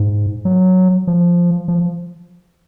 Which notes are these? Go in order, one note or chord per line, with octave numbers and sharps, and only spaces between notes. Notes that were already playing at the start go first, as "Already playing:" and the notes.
Already playing: G#2
F#3
F3
F3